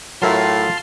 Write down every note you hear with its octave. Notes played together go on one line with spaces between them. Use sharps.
A2 F#3 F4 A#4 E5 A5 C6 F6